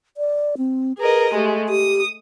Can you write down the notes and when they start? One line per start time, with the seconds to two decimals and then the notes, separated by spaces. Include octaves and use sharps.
0.17 D5
0.57 C4
0.99 G#4 A#4 B4 D#5
1.33 G#3 A3 G4
1.69 G4 D#6